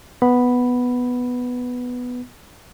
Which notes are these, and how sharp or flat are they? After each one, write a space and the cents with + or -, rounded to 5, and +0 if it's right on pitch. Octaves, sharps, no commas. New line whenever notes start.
B3 +0 B5 +0